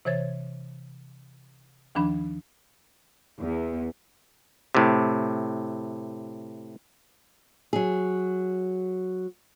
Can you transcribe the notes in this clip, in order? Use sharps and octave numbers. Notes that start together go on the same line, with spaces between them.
C3 E3 C5 C#5 G#6 A6
D#2 D#3 F3 D4 B5
E2
A2 C3
F#3 G#4